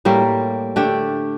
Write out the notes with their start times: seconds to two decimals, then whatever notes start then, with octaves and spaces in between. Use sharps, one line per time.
0.05 A2 G3 A#3
0.76 D3 A3 D4 G4